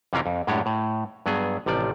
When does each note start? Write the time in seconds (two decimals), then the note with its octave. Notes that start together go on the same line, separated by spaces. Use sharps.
0.13 F2 C3 E3 C#4 F4 A#4
0.26 F2
0.47 F#2 A2 G#3 D4 G4 C#5
0.66 A2
1.26 G2 F#3 B3 G#4
1.66 A1 C3 F3 D5